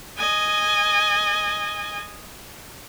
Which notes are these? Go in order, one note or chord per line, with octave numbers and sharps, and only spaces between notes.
D#5 G#5